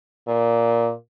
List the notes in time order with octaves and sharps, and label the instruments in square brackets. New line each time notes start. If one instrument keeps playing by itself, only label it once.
[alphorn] A#2